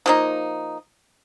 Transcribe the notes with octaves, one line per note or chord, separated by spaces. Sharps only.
F3 A#3 D#4